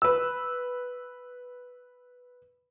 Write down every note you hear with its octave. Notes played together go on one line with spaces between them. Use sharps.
B4 E6